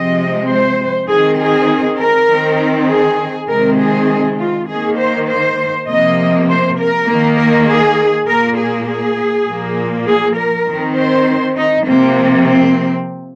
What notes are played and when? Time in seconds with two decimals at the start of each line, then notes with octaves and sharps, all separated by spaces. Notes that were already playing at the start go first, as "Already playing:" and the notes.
Already playing: C3 F3 G#3 C4 D#5
0.49 C5
1.08 D#3 C4 G#4
1.39 G#4
1.98 A#4
2.29 D#3 C4
2.89 G#4
3.48 C3 D#3 G#3 C4 A#4
3.78 G#4
4.39 F4
4.68 D#3 A#3 G#4
4.97 C5
5.29 C5
5.88 C3 F3 A#3 D#5
6.48 C5
6.78 A#4
7.07 D#3 A#3
7.37 A#4
7.68 G#4
8.27 A#2 A#3 A#4
8.57 G#4
8.87 G#4
9.47 A#2 F3 A#3
10.06 G#4
10.37 A#4
10.67 D#3 C4
10.96 C5
11.57 D#4
11.86 C3 F3 A#3 C4
12.46 C4